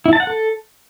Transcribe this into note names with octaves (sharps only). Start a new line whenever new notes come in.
E4
A5
F#5
A4